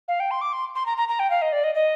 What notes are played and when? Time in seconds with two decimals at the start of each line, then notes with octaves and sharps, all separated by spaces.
0.08 F5
0.20 G5
0.31 C6
0.41 D6
0.53 C6
0.75 C6
0.86 A#5
0.97 A#5
1.08 A#5
1.19 G5
1.30 F5
1.42 D#5
1.52 D5
1.64 D#5
1.75 D#5